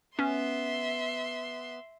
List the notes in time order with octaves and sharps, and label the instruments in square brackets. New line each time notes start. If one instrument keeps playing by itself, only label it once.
[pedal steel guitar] B3 [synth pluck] C#4 [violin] E5 C6